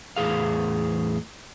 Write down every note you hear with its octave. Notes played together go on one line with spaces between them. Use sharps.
E2 A2 G#4 F5